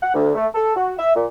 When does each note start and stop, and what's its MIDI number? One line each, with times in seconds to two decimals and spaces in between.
0.02 0.11 78
0.14 0.33 38
0.35 0.47 57
0.54 0.76 69
0.76 0.92 66
0.98 1.14 76
1.15 1.25 46